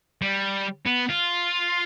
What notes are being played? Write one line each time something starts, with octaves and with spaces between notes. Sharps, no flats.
G3
B3
F4